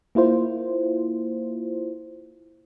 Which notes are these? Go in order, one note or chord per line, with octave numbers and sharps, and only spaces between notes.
A#3 E4 F4 C5